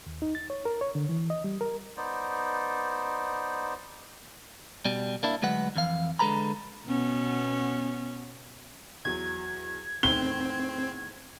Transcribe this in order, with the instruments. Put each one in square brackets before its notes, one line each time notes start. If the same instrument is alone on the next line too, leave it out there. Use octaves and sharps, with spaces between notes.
[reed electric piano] D#2
D#4
A6
C#5
A#4
C#5
D3
E3
D#5
G3
A#4
[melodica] B3 D#4 C5 D5
[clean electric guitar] B2 G3
A#3 D4 E4
D2 F#3 G#3 B4 F#5
F2 E3 F5
D3 G#3 A4 B4 A#5 B5
[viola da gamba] B2 B3 C#4
[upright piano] E2 F#3 [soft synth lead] G#6
[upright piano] E2 A2 D#3 [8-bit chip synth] C4 [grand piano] G7